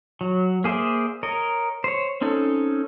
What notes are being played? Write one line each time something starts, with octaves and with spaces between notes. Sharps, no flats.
F#3
A#3 G#4 C5 D5 E5
A#4 C#5 D#5
C5 C#5
C4 C#4 D#4 A4